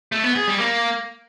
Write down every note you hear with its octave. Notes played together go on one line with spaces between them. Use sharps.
A3
B3
G#4
G3
A#3